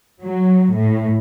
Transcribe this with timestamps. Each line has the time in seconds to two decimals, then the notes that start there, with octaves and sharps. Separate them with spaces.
0.23 F#3
0.74 A2